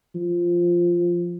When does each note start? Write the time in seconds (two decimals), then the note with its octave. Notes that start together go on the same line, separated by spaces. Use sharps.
0.15 F3